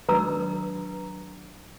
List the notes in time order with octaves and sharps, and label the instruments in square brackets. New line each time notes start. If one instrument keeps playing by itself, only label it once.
[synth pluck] D#3 F#3 D4 [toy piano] B4 A#5 E6